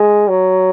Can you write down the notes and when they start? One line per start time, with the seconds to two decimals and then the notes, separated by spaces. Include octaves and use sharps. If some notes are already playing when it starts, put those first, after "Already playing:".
Already playing: G#3
0.28 F#3